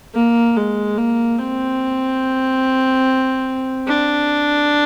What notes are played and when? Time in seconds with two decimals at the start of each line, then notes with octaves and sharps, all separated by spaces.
0.15 A#3
0.57 G#3
0.97 A#3
1.39 C4
3.87 D4